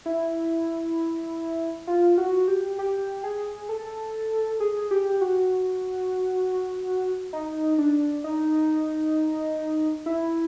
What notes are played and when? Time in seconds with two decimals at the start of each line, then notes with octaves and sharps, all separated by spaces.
0.06 E4
1.87 F4
2.18 F#4
2.48 G4
2.79 G4
3.24 G#4
3.69 A4
4.60 G#4
4.91 G4
5.21 F#4
7.33 D#4
7.78 D4
8.24 D#4
10.06 E4